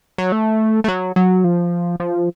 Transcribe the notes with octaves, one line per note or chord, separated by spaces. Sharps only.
F#3
A3
A3
F#3
F#3
F3
F3